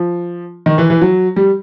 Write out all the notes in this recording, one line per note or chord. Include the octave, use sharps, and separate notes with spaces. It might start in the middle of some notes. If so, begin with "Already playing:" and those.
Already playing: F3
D#3
E3
E3
F#3
G3